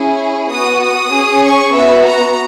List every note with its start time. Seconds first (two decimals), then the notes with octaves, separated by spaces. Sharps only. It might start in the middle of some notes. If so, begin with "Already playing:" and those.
Already playing: C#4 E4 G#4
0.51 B3 F#4 D#6
0.83 D#6
1.13 C#4 G#4
1.44 C#6
1.74 B3 F#4 E5
2.06 A#5